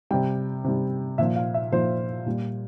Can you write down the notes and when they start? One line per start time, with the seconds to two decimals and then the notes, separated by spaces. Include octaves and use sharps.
0.11 C3 G3 G5
0.64 C3 G3
1.18 A#2 F3 E5
1.36 F5
1.54 E5
1.72 A#2 F3 C5
2.26 A#2 G3